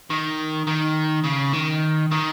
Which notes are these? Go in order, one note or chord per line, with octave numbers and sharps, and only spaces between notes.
D#3
D#3
C#3
D#3
D#3